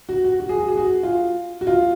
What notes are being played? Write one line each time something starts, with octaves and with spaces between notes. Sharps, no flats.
F#4
F#4
F#4
G#4
F#4
G#4
F#4
F4
F#4
F4